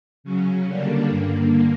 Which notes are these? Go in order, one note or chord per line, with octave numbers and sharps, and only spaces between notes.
C#3 F#3 C#4
D3 G3 A#3 D4
G2 D3 A#3